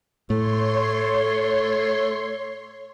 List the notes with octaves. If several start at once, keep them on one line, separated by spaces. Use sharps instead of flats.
A2 A3 C#5 C6